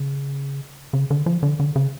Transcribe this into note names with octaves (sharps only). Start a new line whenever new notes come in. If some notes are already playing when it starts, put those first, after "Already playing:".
Already playing: C#3
C#3
D3
F3
D3
D3
C#3